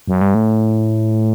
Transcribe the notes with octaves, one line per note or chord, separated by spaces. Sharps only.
F#2
G2
A2